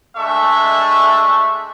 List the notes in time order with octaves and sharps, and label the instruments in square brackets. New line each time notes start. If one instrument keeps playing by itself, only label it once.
[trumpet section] G#3 A3 D4 E5 C#6